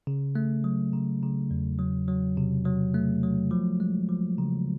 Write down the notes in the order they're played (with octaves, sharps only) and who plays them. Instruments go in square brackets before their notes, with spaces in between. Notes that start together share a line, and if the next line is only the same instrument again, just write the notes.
[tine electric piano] C#3
A3
F#3
C#3
C#3
E2
F#3
F#3
C3
F#3
A3
F#3
F3
G#3
F3
C#3